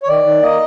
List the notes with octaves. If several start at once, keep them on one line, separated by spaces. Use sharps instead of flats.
C#5
D#3 D5
D#3
A#3 D#5